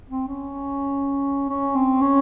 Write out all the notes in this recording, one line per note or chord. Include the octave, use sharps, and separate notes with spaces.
C4
C#4
C#4
C4
C#4